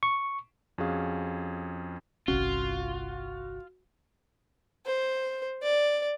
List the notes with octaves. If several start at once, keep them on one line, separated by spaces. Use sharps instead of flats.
C#6
F2 C#4 F#4 G#4 F5
G1 C2 C#4 F4 F#4
C5
D5